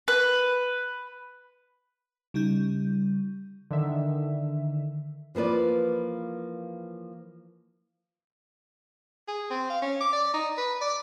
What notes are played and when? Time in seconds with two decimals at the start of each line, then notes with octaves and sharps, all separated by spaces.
0.08 B4
2.34 C#3 G3 D#4 G6
3.71 D3 D#3 E5
5.35 E3 F3 A#3 B4 D5
9.28 G#4
9.50 C4
9.70 F5
9.82 C#4
10.01 D6
10.13 D5
10.33 D#4
10.58 B4
10.81 D5